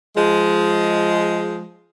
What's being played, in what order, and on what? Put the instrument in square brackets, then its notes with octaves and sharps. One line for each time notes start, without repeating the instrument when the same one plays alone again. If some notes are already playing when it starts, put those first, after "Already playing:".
[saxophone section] F3 G#3